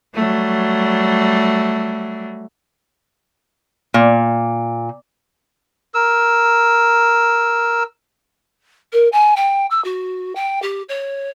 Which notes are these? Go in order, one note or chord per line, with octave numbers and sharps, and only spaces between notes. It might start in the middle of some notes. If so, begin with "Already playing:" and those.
F#3 G3 A3
A#2
A#4 E6
A#4
G#5
G5
E6
F#4
G5
G4
C#5